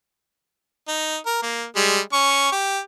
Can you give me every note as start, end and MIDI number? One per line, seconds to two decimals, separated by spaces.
0.88 1.17 63
1.26 1.38 70
1.43 1.64 58
1.76 2.00 55
1.76 2.00 56
2.13 2.49 61
2.13 2.49 85
2.52 2.79 67